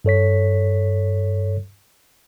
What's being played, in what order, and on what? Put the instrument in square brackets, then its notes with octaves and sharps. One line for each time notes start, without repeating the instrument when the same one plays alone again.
[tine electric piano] G2 A4 C#5 B6